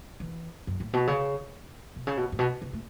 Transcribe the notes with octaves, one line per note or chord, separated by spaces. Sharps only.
E3
F#2
A2
B2
C#3
B2
C#3
B2
A2
B2
C#3
A3